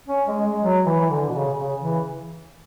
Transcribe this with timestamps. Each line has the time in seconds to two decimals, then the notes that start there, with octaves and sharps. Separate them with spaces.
0.08 C#4
0.27 G#3
0.45 G#3
0.62 F#3
0.86 E3
1.00 E3
1.10 D3
1.29 B2
1.34 C#3
1.58 C#3
1.82 E3